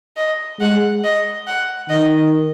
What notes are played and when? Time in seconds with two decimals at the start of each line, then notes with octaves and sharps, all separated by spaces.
0.16 D#5
0.60 G#3 F#5
1.04 D#5
1.47 F#5
1.89 D#3 D#5